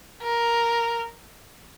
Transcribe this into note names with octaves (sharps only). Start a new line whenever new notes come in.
A#4